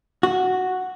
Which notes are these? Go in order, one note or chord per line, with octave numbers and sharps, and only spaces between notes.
F#4